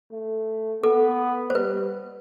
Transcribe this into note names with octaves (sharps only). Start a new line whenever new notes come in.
A3
B3 A4
C5
G3 B4